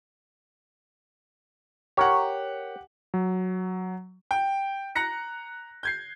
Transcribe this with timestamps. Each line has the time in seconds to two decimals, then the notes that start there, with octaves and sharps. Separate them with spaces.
1.97 G4 A#4 C#5 F#5
3.14 F#3
4.31 G5
4.95 A#5 F#6 A#6 C#7
5.83 G6 G#6 C7